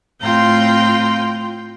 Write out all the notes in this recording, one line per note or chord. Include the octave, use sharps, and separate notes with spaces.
A2 C4 F4 G5 A#5 C6